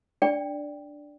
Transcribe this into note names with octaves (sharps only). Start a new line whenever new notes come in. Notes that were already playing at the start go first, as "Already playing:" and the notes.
D4 D5 G5